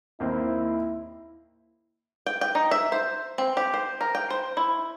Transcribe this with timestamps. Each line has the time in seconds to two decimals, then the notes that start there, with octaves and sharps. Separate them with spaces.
0.20 D#2 A#3 C4 E4
2.26 G5
2.41 G5
2.55 D#4
2.71 E5
2.92 C5
3.38 C4
3.57 G4
3.74 C5
4.01 A#4
4.15 G5
4.30 C5
4.57 E4